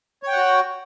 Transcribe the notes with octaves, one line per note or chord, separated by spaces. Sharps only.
F#4 C#5 F#5 G5